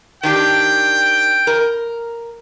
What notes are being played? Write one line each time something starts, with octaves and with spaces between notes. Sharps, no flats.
D#3 D4 G4 G5
A#4